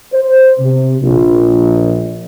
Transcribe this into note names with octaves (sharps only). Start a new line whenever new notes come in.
C5
C3
A#1